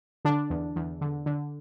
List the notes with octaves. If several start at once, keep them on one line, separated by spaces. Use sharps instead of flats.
D3 D4
E2
E2
D3
D3